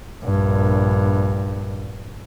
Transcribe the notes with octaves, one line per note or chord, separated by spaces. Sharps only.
A#1 G2